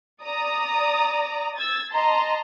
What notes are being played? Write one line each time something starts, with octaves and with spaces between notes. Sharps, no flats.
D5 A#5 D#6
E6 G#6 A6
D#5 A5 A#5 C6